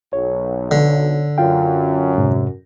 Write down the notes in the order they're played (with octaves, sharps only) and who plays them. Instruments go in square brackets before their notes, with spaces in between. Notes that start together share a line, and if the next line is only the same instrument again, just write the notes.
[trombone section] B1 [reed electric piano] C#5
[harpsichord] D3
[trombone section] F#2 [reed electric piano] F4 F5 G5
[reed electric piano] F2 G#2 C3